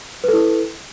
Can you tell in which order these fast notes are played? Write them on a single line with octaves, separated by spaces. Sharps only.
B4 A4 E4